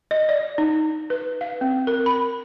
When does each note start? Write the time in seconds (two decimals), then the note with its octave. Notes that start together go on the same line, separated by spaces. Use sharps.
0.11 D#5
0.29 D5
0.58 D#4
1.10 B4
1.41 F5
1.61 C4
1.87 A#4
2.06 B5